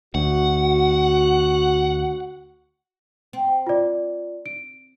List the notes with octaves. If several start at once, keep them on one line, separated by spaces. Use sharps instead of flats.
D2 F#4 F#5
C4
F4 D5
D7